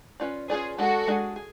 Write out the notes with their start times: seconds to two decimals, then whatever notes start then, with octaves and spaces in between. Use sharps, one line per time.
0.20 C#4 F4 B4 D5
0.49 C#4 F4 G#4 B4 D5
0.78 G#3 D4 F#4 G#4 A4
1.07 G#3 D4 G#4
1.36 G#4